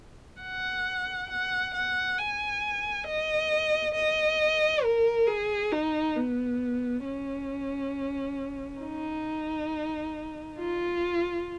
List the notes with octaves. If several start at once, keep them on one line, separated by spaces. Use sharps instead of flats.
F#5
F#5
F#5
G#5
D#5
D#5
A#4
G#4
D#4
B3
C#4
D#4
F4